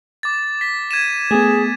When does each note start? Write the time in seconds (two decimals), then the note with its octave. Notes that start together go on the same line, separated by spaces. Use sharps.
0.23 D6 A6
0.61 B6
0.91 G#6 D#7 E7
1.31 A3 B3 G#4